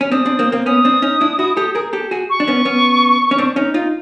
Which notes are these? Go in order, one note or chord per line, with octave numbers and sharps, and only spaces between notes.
C#4
C4 D4 D#6
C4 D4
A#3 C4
A#3 C4
B3 C#4 D#6
C4 D4
C#4 D#4
D4 E4
E4 F#4
G4 A4
G#4 A#4
G4 A4
F#4 G#4
C#6
D4
B3 C#4
B3 C#4
C#4
C4 D4
C#4 D#4
D#4 F4